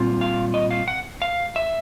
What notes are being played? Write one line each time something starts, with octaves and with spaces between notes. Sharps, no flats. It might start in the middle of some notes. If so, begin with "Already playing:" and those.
Already playing: A#2 G3 C4 F4
F5
D#5
F5
F#5
F5
E5